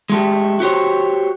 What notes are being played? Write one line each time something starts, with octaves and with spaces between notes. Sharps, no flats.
G#3 A3 G4
F#4 G4 C5 C#5